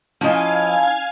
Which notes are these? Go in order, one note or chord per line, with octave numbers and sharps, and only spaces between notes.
F3 C#4 E4 D#5 F5 G#5 A5